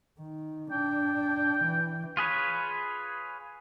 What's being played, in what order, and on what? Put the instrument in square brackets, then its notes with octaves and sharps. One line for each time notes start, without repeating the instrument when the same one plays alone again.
[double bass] D#3
[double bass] D4 [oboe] G5
[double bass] E3
[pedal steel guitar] F4 G#4 B4 C#5